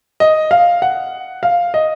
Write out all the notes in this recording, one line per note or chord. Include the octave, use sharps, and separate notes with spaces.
D#5
F5
F#5
F5
D#5